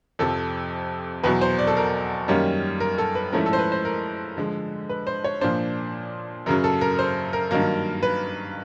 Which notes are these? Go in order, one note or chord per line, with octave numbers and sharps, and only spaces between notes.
F2 C3 F3 A4
E2 B2 F#3 B4
C5
D5
A4
A#4
F#2 D#3 G3 A#3 C#4
A#4
A4
B4
G#2 F3 A3 C#4 E4 A#4
A4
C5
B4
C5
A#4
D3 F3 G#3
B4
C5
C#5
A#2 F3 A#3 D4 C5
F#2 C#3 F#3 A#4
A4
A#4
C5
A#4
G2 D#3 F#3 A#3 A#4
B4